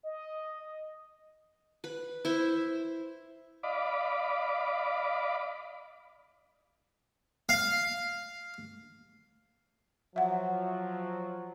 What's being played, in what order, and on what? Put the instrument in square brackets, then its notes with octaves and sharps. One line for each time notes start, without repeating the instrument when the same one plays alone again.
[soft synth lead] D#5
[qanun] B4 B5
E4 C5 E5
[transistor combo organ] D5 D#5 F5 B5 D6
[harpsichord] F5
[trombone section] F3 F#3 [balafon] E5 F#5